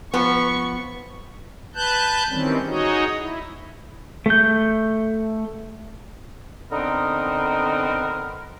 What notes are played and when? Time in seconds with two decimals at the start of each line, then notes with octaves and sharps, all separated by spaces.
0.14 F3 B3 C#6
1.75 B4 A5 F#6 G6
2.29 D#3 E3 G3 C4 C#4
2.67 D#4 F#4 G#4 C#5 D#5
3.19 E4
4.26 A3 G6
6.72 D3 B3 C4 D#4 A#4